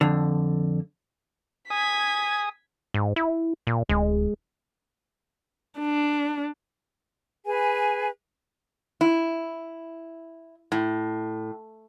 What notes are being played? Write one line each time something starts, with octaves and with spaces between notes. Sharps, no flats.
F2 D3
G#5 D#6 G#6 B6
G#2
E4
A#2
D1 G#3
D4
G#4 B4 G#5
E4
A2